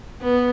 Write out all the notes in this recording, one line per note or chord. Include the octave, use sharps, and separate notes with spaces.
B3